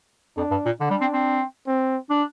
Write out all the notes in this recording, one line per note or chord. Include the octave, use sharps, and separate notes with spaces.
F2 D4
G2
A#2
D3 D4
G3
C4
C4
C4
D4